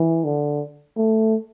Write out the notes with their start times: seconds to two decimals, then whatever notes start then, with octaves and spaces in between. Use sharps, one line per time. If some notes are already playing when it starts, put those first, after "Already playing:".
Already playing: E3
0.25 D3
0.97 A3